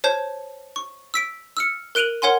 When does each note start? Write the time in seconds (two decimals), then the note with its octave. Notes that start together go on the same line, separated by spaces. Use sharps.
0.04 C5 C#5 A5 G6
0.76 C#6
1.14 E6 B6 D7
1.57 E6 F6 C#7
1.95 A#4 F#6 D7 D#7 F7 F#7
2.22 A#4 C#5 F#5 G#5 C6